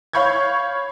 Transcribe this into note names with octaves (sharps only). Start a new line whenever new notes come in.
C#5 F5 B5 C#6 G6 G#6